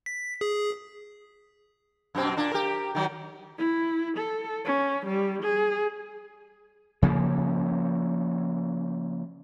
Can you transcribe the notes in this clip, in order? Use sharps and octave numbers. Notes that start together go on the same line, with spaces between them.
B6
G#4
F#2 B2 C4
A#2 D4
G4 A#4
D#3 F#3
E4
A4
C#4
G3
G#4
C#3 F3 A#3